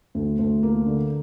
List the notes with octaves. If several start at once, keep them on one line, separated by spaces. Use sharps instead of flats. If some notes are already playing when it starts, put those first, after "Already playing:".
D2
D2
A#3
D3